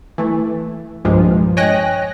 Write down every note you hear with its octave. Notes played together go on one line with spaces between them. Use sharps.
E3 A3
C2 G2 A#2 F3 G#3
C#5 D#5 G5 G#5 F#6 A#6